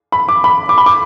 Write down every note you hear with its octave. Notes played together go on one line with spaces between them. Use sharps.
B5
D6
B5
D6
B5
D6